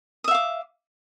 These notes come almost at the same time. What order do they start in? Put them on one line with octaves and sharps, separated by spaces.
D#6 E5 F5 D6